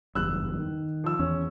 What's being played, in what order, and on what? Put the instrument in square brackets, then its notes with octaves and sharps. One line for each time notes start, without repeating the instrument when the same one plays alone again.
[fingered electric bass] F#1 E2 G2 [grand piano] E6 F#6
[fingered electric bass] D#3
[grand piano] F3 E6
[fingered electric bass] E2 [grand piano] C#4